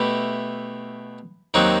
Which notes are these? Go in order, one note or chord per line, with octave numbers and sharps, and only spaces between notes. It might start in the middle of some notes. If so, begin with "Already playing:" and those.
Already playing: B2 A3 E4 G4
D#2 D#3 F#3 C4 F#4